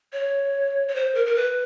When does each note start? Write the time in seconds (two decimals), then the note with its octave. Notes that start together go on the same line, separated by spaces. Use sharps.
0.13 C#5
0.89 C#5
0.95 C5
1.15 A#4
1.26 A#4
1.36 B4